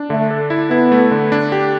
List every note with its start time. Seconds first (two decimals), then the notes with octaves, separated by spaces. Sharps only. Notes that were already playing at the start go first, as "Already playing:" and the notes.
Already playing: D4
0.10 D3 A3
0.31 A4
0.50 E4
0.71 B3 E4
0.92 A3
1.11 D3
1.32 D4
1.52 G4